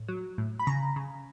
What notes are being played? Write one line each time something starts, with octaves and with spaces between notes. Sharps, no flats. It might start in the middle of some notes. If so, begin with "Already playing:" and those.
Already playing: A2
F#3
A2
B5
C#3 A#5
C#3